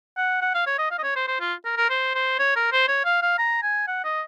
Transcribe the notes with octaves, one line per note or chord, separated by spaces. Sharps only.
F#5
F#5
F5
C#5
D#5
F5
D#5
C#5
C5
C5
F4
A#4
A#4
C5
C5
C#5
A#4
C5
C#5
F5
F5
A#5
G#5
F#5
D#5